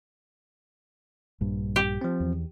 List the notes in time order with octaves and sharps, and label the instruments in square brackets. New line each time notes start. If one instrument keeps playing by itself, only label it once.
[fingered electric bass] A#1 G2
[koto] G4
[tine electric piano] F3 C4
[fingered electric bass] E2